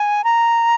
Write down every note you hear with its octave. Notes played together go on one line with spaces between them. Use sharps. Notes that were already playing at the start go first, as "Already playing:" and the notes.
Already playing: G#5
A#5